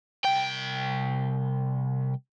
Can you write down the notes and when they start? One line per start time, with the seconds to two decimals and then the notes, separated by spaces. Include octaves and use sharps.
0.24 C2 G5